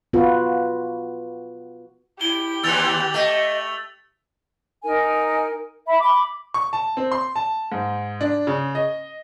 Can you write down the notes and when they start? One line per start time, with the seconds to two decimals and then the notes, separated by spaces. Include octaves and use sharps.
0.13 B3 F4 F#4 B4
2.21 E4 G4 G7
2.63 D#2 E3 E6 A6 F7
3.14 A3 D#5
4.83 D#4 A#4 G#5
5.86 E5 B5
6.00 B5 D6
6.54 C#6
6.73 A5
6.97 C4
7.12 C6
7.36 A5
7.72 G#2
8.21 D4
8.47 C#3
8.75 D#5